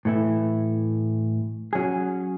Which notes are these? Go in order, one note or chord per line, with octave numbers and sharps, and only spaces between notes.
A2 E3 A3 E4
F#3 C#4 G#4